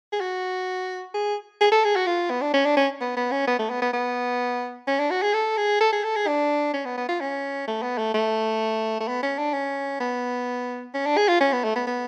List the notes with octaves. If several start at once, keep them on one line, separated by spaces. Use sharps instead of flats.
G#4
F#4
G#4
G#4
A4
G#4
F#4
F4
B3
D4
C#4
D4
C#4
B3
B3
C#4
B3
A3
B3
B3
B3
C#4
D4
F#4
G#4
A4
G#4
A4
G#4
A4
G#4
D4
C#4
B3
B3
F4
C#4
A3
B3
A3
A3
A3
B3
C#4
D4
C#4
B3
C#4
D4
G#4
F4
C#4
B3
A3
B3
B3